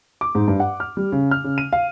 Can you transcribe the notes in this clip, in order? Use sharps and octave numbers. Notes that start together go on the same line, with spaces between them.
D6
G#2
G2
F#5
F6
G3
C#3
F6
C#3
D#7
F5